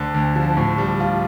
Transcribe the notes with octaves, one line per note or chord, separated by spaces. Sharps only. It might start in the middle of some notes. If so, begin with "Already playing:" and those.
Already playing: D2 D3
D2
F3
A2
G3
F4